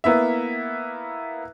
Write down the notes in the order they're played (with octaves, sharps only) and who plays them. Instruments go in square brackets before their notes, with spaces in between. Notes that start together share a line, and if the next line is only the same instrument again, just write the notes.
[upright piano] A#3 B3 E4 E5